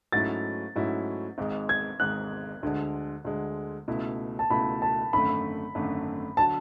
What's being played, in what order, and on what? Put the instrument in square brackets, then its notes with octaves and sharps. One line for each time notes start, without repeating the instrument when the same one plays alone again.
[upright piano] G#2 F#3 A3 C#4 E4 [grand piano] A6
[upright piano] G#2 F#3 A3 C#4 E4
G#1 G#2 G#3
[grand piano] G#6
[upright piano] G#1 G#2 G#3 [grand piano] F#6
[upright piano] D2 D3 G#3
D2 D3 G#3
C#2 B2 A3 E4
[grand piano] A5
[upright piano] C#2 B2 A3 E4 [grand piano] B5
[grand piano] A5
[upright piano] G#1 F#2 D3 A3 [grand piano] B5
[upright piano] G#1 F#2 D3 A3
[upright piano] D3 F#3 [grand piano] A5